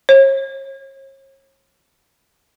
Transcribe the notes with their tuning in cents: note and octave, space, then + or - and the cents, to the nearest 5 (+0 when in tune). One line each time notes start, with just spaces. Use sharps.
C#5 -40